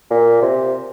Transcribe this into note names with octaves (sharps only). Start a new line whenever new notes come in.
A#2
C3